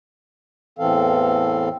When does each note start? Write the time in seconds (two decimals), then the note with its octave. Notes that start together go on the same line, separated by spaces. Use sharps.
0.79 E2 A2 E3 C4 A4 F5